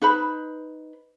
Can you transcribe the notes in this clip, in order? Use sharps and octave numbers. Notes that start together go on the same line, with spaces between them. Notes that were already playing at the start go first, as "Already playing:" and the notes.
D#4 B4 C5 B5